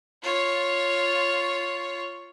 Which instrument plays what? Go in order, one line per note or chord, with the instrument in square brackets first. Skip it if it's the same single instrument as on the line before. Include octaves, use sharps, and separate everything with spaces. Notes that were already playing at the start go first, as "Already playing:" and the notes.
[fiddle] F4 C#5